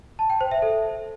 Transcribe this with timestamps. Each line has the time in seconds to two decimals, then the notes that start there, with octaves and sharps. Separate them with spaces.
0.19 A5
0.30 G5
0.41 C5
0.51 E5
0.62 A4